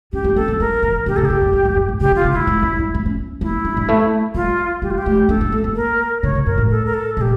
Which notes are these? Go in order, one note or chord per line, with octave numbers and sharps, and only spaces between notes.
C#4 G4
A#3
C#4 A4
A#3
G3 A#4
E3
D3 G4
C#3 A4
A#2 G4
G2
E2
F2
G2
A2
C#3 G4
D3
F4
C#3
F4
A3 E4
A3
G3
G3
A#3
C#4
A#3 E4
D4
G3
A3
G3 F4
G3 G4
F4
G4
A3
D4 A4
A#3
A3
A#3
A#4
D3 C#5
C#3
G2 A#4
A2
A4
A#4
A4
A#2 G4 A4